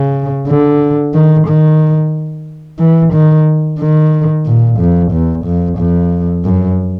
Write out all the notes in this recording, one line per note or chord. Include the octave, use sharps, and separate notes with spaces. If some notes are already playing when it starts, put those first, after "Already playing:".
Already playing: C#3
D3
D#3
D#3
E3
D#3
D#3
A#2
F2
E2
F2
F2
F#2